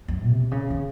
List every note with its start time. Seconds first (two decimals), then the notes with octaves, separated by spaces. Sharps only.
0.08 F#2
0.26 C3
0.51 C#3
0.70 D#3